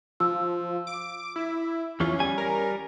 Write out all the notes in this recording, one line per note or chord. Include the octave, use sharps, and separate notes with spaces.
F3 E6
D6
E4
E2 E3 C#4 F4
G3 G#5
A#4